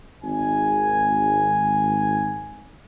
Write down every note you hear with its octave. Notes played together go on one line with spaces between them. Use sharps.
G#1 G#5